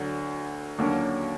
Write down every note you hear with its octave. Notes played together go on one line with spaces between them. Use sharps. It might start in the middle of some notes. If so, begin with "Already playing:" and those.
Already playing: D2 D3 F#3
D#2 D3 F#3 A#3 C#4